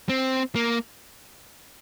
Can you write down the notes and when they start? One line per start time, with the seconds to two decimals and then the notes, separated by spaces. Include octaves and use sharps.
0.09 C4
0.56 A#3